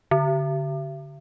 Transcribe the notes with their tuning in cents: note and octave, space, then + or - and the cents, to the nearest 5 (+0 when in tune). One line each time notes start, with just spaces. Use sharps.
D3 -25